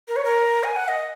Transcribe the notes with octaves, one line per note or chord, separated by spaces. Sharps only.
A#4
C#5
A#4
G#5
F#5
D#5